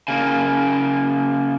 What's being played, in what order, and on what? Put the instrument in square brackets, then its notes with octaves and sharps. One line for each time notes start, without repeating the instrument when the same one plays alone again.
[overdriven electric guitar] C#3 A#3